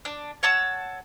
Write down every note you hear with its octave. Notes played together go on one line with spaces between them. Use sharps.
D4
C#5 F#5 A5 E6